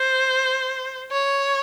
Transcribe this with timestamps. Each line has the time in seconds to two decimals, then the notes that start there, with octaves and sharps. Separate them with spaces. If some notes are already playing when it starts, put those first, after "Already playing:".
Already playing: C5
1.12 C#5